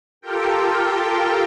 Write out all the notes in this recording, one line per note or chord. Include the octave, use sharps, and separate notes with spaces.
F4 G4 A4 A#4 G5